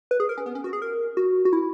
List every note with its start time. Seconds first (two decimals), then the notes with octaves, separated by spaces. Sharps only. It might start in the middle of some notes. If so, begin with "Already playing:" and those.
0.11 B4
0.20 G#4
0.29 A#4
0.38 C#4
0.46 B3
0.55 C#4
0.64 F#4
0.73 G#4
0.82 A#4
1.17 F#4
1.45 F#4
1.53 E4